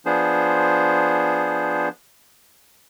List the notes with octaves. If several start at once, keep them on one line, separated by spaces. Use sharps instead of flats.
F3 B3 D4 G#4 C5